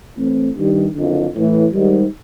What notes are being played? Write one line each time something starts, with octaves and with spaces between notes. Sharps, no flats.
A2 E3 A3 C4
G2 D#3 G3
F#1 F2 D3
A2 E3 A3
G#2 D#3 G3